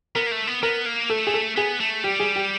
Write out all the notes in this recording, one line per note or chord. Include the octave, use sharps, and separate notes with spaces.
B3 A#4
A#3
A3
B3
B3 A#4
A#3
A3 A4
G#4
A4
B3 G#4
A3
G3 G4
G#4
G4